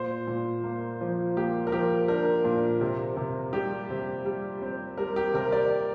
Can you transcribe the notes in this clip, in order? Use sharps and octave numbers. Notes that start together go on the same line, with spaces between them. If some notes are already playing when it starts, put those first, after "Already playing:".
Already playing: A#2 C5
A#2
A#3
F3
A#3 G4
A#4
F3 G4
D4 A#4
A#2
C3
C3
G3 G4
C3
G3
C4
G3 A#4
G4
C3 A#4
D5